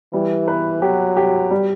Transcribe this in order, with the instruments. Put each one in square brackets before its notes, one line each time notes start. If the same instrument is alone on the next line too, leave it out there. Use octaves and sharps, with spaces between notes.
[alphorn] E3 [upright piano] G3
[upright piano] B4
[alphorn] F#3 [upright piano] G4
[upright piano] G4
G3